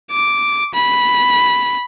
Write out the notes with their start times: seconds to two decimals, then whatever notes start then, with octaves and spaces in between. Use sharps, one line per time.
0.11 D6
0.74 B5